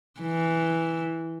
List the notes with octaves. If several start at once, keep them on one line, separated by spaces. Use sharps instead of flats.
E3